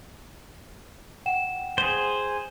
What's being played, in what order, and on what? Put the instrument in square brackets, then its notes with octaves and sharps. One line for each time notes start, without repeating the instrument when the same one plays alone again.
[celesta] F#5 G5 E7
[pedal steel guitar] G#4 C5